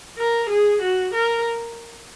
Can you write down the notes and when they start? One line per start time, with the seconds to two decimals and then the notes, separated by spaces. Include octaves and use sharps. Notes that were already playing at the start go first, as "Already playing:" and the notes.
0.18 A#4
0.49 G#4
0.82 F#4
1.14 A#4